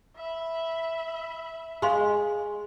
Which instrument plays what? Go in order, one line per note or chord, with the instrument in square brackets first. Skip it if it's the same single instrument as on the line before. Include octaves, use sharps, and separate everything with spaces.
[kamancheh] E5 B5
[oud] G#3 [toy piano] F5 C6 C#6